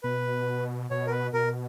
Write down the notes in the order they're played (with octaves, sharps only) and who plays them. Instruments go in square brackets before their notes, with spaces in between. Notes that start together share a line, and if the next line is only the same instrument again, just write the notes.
[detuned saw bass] B2 [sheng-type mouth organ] B4
[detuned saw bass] B2 [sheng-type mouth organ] C#5
[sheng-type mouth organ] A#4
B4
[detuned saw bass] B2 [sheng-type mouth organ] A#4